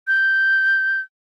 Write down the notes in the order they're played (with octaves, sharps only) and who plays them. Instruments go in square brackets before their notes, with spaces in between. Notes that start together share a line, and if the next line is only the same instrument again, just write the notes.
[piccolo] G6